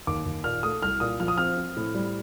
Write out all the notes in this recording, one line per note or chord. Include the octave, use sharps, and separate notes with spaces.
D#2 D6
D#2
A#2 F6
A3 D#6
C2 F6
A#2 D#6
F3 F6
D#6
C4 F6
C4
A2
G3